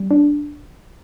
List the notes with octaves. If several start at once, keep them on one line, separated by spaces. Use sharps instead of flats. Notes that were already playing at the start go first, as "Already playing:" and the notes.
Already playing: G3
D4